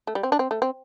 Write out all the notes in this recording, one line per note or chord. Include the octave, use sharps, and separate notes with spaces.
A3
G3
C4
D4
C4
A3
C4